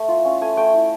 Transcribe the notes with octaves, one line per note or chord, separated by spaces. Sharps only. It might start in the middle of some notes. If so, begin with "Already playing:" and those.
Already playing: A3
F4
C#4
A3 G#5
A3 G5
E4